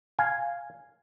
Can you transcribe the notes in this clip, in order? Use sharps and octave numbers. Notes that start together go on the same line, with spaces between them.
F5 G#5